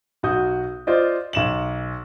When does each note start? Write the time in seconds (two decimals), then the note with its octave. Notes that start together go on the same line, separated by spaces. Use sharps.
0.23 B1 F#4 D#6 G6
0.87 F4 C5 D5 D#5
1.33 B1 E7 F#7